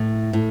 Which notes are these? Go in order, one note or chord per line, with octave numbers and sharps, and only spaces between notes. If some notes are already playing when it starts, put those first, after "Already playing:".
Already playing: A2
A2